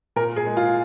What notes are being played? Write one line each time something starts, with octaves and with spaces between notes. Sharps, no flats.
A#2 A#4
G#4
G#3
F4